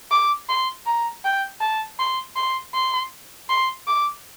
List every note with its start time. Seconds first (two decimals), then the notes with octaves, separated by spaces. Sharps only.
0.11 D6
0.49 C6
0.86 A#5
1.24 G5
1.61 A5
1.99 C6
2.36 C6
2.74 C6
3.49 C6
3.87 D6